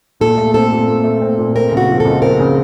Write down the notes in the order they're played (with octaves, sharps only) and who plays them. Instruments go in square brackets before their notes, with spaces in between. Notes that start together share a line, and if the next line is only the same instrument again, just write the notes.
[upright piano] A#2 [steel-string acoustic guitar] A4
[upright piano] A3
[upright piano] C4 [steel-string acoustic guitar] A4
[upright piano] A#2
A#2
A3
C4
A#2
[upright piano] C4 [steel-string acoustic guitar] A#4
[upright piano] C#3
[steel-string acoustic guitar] F#4
[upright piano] F3
[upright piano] C#2 [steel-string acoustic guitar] A4
[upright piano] C4 [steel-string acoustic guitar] A#4
[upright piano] C#3